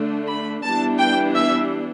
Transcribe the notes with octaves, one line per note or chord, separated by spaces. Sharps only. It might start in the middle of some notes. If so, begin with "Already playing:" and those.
Already playing: D3 A3 D4
B5
E3 G3 B3 D4 A5
G5
E5